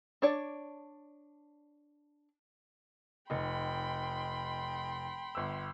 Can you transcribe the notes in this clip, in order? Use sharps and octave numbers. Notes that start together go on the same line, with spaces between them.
D4 C#5 D5
F1 D#4 G5 B5 C6
G1 E6